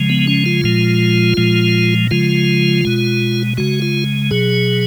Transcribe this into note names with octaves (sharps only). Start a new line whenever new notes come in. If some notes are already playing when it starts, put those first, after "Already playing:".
Already playing: C#3 F3 G#3
B3
C#4
F4
A#2 F3 G#3
A#2 F3 G#3
C#3 F3 G#3 F4
B2 G#3
C#3 G#3 F#4
F4
B2 F#3 G#4